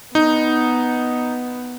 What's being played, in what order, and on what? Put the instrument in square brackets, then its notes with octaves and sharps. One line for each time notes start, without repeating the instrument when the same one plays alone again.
[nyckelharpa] B3 [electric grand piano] D#4